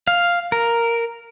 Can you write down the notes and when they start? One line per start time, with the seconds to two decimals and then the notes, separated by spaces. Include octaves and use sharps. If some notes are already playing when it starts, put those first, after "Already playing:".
0.07 F5
0.52 A#4